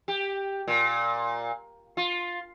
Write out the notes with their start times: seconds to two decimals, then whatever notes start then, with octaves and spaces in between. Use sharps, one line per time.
0.08 G4
0.68 A#2
1.97 F4